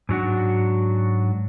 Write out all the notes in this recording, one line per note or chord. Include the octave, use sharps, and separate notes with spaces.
G#2 F#3 D4 F#4